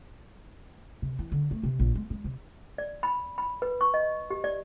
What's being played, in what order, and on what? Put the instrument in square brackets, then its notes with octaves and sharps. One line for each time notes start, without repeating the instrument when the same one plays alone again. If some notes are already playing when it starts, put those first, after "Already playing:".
[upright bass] C3
E3
D3
A3
C3
A#1
G#3
G#3
C3
[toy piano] D5
B5
B5
B4
C#6
D#5
G4
D5